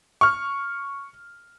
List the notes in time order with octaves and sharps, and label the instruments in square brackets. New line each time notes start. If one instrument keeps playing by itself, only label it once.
[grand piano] C#6 F6